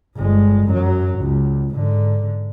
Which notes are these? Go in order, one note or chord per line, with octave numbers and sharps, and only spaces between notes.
G1 G#3
F#2 F#3
C#2
G#2 D3